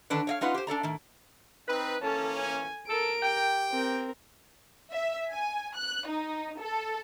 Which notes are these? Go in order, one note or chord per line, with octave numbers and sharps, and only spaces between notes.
D3 D#3 D4 B4
C#5 D#5 F5
C#4 D#4 F4 B4 F#5
G4 C5
D4 A4 D5 A#5
A2 D#3
C4 D#4 B4
E3 A#3 C#4 A4 A5
G#5
A4 A#4 D7
G4 G5
C4 A#4
E5
G#5
F#6
D#4
A4